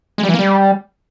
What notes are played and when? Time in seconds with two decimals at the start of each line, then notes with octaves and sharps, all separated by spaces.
0.18 G#3
0.23 G3
0.28 E3
0.34 A#3
0.39 G3